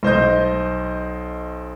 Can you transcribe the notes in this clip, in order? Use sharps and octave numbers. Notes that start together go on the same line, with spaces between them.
B1 C5 D#5 G6